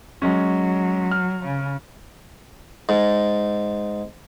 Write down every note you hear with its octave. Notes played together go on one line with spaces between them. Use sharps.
F#3 G#3 C#4
F6
C#3
G#2